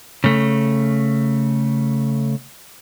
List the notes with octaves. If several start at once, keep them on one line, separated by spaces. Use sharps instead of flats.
C#3 A3